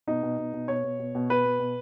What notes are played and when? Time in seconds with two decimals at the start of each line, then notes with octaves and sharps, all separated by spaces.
0.07 B2 D#4
0.23 B2
0.38 B2
0.53 B2
0.68 B2 C#5
0.84 B2
0.99 B2
1.15 B2
1.30 B2 B4
1.45 B2
1.60 B2